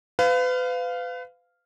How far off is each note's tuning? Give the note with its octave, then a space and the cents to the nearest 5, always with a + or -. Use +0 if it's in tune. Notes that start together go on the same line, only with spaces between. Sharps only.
B4 +35 F5 +0